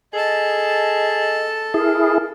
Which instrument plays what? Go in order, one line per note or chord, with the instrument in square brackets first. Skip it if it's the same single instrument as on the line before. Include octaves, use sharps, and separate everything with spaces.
[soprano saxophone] G#4 [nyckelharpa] A4 A5 [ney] D#5
[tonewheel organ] E4 G#4 [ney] A#4